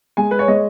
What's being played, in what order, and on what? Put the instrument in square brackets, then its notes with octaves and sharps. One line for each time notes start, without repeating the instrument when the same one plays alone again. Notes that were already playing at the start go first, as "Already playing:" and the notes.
[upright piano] G#3 G#5
B4
C#5
G#3 D#5